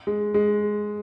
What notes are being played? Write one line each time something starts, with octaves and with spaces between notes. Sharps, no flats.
G#3
G#3